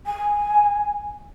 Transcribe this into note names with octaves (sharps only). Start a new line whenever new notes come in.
G#5